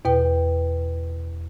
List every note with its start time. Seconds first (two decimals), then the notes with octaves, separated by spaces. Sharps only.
0.05 E2 B2 B4 G5